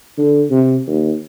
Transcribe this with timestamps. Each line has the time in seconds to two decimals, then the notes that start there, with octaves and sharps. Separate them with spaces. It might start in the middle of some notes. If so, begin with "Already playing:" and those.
0.17 D3
0.50 C3
0.87 D#2